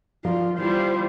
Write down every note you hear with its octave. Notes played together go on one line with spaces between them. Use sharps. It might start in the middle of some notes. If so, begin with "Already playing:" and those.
F3 F4 A#4 D5
E3 G3 E4 F4 C5